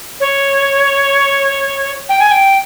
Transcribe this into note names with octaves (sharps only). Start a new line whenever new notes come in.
C#5
G5
G#5
G5